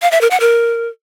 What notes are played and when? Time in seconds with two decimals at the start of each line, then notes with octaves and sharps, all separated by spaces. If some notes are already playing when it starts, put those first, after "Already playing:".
0.02 F5
0.11 E5
0.21 A#4
0.31 F#5
0.40 A#4